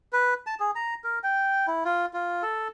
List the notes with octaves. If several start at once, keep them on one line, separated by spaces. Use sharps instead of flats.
B4
A5
G#4
A#5
A#4
G5
E4
F4
F4
A4